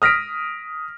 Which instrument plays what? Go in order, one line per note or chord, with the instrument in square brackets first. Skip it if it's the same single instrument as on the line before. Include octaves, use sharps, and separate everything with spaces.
[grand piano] D#6 F6 A#6 B6 D7